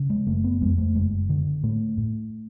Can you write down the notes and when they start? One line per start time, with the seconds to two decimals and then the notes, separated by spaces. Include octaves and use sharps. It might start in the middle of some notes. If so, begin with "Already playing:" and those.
Already playing: C#3
0.10 G#3
0.26 F#1 A3
0.44 B3
0.61 F2 G#3
0.78 A3
0.95 F#1 G#3
1.29 D3
1.63 A2 A3
1.98 A2